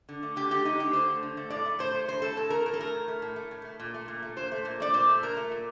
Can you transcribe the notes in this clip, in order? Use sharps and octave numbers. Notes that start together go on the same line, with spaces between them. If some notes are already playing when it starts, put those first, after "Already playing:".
D3
A3
D3 G4
A3 G4
D3 D#4
A3 G4
D3 C5
A3
D3
A3
A2 D5
A3
A2 C5
A3
A2 C5
A3 A4
A2 A4
A3 A#4
A2 A#4
A4
A3 A#4
A2
A3
A2
A3
A2
A3
A#2
A3
A#2
A3
A#2 C5
A3
A#2
A3 D5
A#2 C5
A3
A#2 A#4
A3
A#2